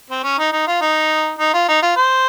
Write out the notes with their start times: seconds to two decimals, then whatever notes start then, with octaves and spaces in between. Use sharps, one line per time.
0.10 C4
0.24 C#4
0.38 D#4
0.53 D#4
0.67 F4
0.82 D#4
1.39 D#4
1.53 F4
1.68 D#4
1.82 F4
1.97 C5